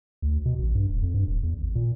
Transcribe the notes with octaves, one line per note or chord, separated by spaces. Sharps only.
D2
B2
A1
G2
D#1
F2
G2
D#1
E2
G#1
A#2